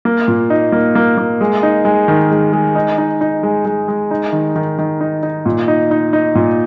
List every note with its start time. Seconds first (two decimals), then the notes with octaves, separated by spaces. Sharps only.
0.05 A#3
0.28 A#2
0.50 D#4
0.72 A#3
0.95 A#3
1.18 A#3
1.41 G#3
1.63 D#4
1.85 G#3
2.08 D#3
2.31 G#3
2.53 G#3
2.75 D#4
2.98 D#4
3.21 D#4
3.43 G#3
3.65 G#3
3.88 G#3
4.11 D#4
4.33 D#3
4.56 D#3
4.78 D#3
5.01 D#4
5.23 D#4
5.46 A#2
5.68 D#4
5.91 D#4
6.13 D#4
6.35 A#2